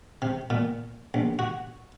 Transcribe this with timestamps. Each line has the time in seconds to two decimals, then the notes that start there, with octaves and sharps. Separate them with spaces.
0.22 C3
0.50 A#2
1.14 A#1
1.39 F#4